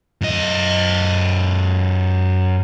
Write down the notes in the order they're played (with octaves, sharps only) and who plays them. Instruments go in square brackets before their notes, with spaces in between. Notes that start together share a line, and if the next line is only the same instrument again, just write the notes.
[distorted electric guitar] F#2 D#5